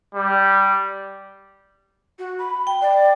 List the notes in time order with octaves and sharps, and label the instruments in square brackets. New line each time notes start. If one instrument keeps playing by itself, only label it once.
[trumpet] G3
[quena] F#4
B5
[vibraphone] G5
[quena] D5